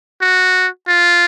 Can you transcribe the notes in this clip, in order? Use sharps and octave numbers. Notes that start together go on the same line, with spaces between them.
F#4
F4